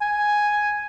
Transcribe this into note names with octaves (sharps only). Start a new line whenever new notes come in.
G#5